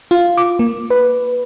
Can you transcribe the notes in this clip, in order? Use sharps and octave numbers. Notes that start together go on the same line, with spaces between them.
F4
D6
A#3
B4